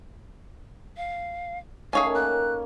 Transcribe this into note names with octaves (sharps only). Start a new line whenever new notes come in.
F5
D#3 A3 C#4 G#4 C#5 F5 G#5
A#3 F#6